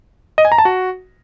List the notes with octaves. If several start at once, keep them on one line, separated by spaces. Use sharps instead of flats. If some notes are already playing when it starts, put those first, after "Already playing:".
D#5
G#5
A#5
A5
F#4